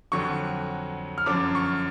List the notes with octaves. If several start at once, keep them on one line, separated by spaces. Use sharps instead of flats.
F2 D3 F#3 C#6
F6
F#2 D3 F3 D6
C#6